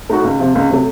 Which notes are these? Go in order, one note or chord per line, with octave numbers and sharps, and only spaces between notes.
A2 A3 D#4 F#4
C#2
C3 F3
C#2
C3 F#3 A3